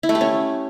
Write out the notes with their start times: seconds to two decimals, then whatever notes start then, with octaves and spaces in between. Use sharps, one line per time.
0.03 E4
0.09 A3
0.15 G4
0.21 C#4